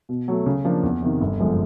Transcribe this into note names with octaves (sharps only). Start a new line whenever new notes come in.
B2
F#3 A3
C#3
F3 A#3 D4
E2
C3 D#3
G1
F#2 D3 F3 G#3